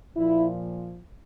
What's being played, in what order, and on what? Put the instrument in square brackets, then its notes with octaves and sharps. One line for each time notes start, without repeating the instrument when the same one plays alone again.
[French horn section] A#2 F3 E4